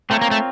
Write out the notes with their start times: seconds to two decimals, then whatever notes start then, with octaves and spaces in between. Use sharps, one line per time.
0.10 A3 C4 F4 A#4 C#5
0.21 A#3
0.31 A3